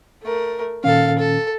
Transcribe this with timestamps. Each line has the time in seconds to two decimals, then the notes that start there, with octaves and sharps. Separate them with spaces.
0.23 A3 A#4
0.84 A#2 D#3 C#4 A4 F5
1.18 A4